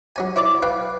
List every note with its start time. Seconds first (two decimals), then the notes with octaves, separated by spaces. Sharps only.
0.16 F#3 C#4 G#5
0.36 E4 C#5 D5 D6
0.62 B4 F5 G5